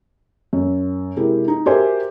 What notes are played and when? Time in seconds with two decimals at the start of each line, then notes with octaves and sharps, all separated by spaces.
0.53 F#2
1.16 C3 G#3 E4 G4 A#4
1.48 D#4
1.66 F#4 G4 A#4 C5 E5 G#5